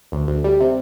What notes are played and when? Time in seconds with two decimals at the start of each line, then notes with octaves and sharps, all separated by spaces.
0.12 D2
0.28 D2
0.44 G3
0.60 C3